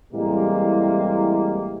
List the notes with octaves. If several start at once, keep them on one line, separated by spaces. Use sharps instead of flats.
A2 C3 E3 G3 G#3 A#3